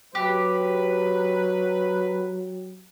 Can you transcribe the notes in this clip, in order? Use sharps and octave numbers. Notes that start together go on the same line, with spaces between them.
F#3 G4 B4